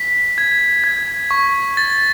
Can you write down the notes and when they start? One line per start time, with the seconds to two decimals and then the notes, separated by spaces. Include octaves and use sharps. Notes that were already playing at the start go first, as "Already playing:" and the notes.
Already playing: B6
0.38 G#6
0.84 G#6
1.31 C#6
1.77 A6